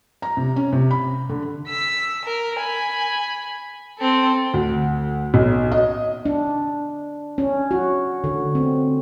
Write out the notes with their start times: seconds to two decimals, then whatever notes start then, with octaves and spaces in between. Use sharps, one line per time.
0.22 A#5
0.37 C3
0.56 C#4
0.73 C3
0.91 B5
1.29 D3
1.67 E6 B6
2.25 A#4
2.59 G#5 B5
3.98 C4 A4
4.54 D2
5.34 B1
5.72 D#5
6.25 D4
7.38 C#4
7.71 F#4
8.24 D3
8.55 C4